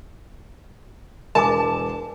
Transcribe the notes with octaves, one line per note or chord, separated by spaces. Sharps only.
E1 A#4 G#5 A5 D6